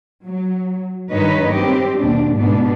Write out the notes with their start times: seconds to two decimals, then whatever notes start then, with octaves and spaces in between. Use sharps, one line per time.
0.24 F#3
1.10 G2 D#3 B4 C#5 D#5
1.53 C4 G4
2.00 D#2 B2 D4
2.33 G#2 B2 B3 D4